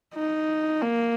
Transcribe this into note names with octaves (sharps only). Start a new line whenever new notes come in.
D#4
A#3